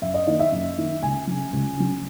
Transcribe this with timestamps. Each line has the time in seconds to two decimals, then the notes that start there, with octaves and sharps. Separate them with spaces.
0.02 F#2 E5
0.14 D#5
0.27 D#3 A#3 D#5
0.40 E5
0.52 F#2
0.77 D#3 A#3
1.02 C#2 G#5
1.27 C#3 F#3
1.53 C#2
1.77 C#3 F#3